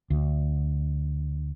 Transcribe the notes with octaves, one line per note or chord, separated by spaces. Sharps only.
D2